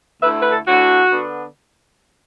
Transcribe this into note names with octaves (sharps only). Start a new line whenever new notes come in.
D2 D3 A3 E4 B4 E5
B4
A4
D2 D3 A3 E4 F#4
D3 B3 D4